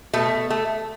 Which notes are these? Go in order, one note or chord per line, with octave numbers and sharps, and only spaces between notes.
B2 A3
A3